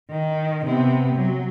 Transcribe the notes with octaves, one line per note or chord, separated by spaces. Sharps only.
D#3
C3 B3
F#3